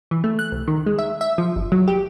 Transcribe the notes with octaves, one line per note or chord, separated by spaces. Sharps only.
E3
A3
F#6
C2
D#3
G#3
E5
E5
F3
G1
F#3
G4